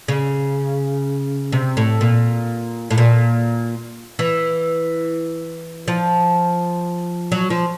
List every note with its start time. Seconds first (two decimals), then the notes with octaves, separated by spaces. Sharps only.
0.08 C#3
1.52 C3
1.77 A2
2.01 A#2
2.91 A2
2.98 A#2
4.19 E3
5.88 F3
7.32 F#3
7.50 F3